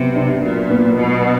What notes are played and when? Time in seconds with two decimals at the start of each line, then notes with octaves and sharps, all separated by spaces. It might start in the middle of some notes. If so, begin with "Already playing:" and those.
Already playing: C3 F#3 B3
0.15 D4
0.42 A#2 F#3
0.70 B3
0.97 B2 F#3